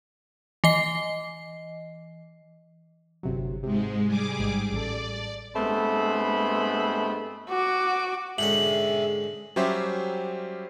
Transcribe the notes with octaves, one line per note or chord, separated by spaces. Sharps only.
E3 D#5 C7
G1 C3 F#3
G#2 C3 G#3
G3 G#4 D6
A1 G#2
A1 A4 D5
G2 G#3 A3 B3 C4 B5
F#4 D6
G#2 D3 C#4 G#4 E5 G5 F#7
F#3 G3 C#4 G4 C5 E5